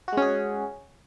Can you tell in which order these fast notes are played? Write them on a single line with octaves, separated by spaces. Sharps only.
F#4 G#3 C#4 G#4